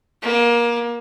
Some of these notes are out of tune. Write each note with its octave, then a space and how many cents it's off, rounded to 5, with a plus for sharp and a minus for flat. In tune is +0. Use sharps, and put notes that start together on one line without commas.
A#3 +25